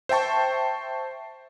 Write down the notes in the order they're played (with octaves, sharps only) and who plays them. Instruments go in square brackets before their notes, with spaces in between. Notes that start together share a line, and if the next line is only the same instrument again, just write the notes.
[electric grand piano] C5 E5 G5 A5 C#6